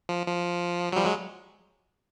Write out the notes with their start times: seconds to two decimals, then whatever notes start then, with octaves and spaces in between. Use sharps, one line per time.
0.09 F3
0.27 F3
0.92 F#3
0.96 F3 G3
1.05 F#3 G#3